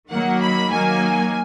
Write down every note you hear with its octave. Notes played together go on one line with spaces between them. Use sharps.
D#3 F#3 A#3 F#5
B5
D#3 F#3 A#3 G#5